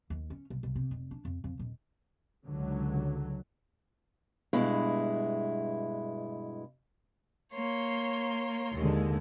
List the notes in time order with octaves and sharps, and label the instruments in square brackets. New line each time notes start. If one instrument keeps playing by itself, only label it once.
[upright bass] D#2
C#4
C2
C2
C3
F1
D4
F2
F2
D#1
[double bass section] C#2 D3 F#3
[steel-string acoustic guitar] G2 B2 G#3 E4
[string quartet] A#3 C#5 C6
[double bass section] D#2 D3 [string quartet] G#3